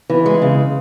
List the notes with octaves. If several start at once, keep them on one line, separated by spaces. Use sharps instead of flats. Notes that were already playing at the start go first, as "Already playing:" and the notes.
E3
G#3
C#3